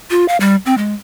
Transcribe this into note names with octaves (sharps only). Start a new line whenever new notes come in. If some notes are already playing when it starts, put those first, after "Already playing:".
F4
F5
G3
C4
G#3